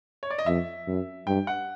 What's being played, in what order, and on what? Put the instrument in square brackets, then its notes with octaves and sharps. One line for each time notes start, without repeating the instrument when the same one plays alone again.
[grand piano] C#5
D5
D#5
[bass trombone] F2 [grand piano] E5
[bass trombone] F#2
[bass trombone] G2 [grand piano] G5
[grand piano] F#5